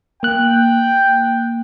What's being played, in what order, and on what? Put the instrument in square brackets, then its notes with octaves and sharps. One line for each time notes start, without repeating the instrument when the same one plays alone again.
[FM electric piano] A#3 F#6 [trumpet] G5